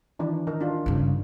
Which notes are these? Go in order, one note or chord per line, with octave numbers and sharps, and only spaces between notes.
D#3 E3 D4
D#3 D#4 A#4
D4 F4
G2 C#3